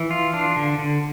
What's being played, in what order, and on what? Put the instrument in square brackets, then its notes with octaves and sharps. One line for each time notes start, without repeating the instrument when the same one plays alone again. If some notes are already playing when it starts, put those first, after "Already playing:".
Already playing: [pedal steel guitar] E3
F4
D4
D3
D3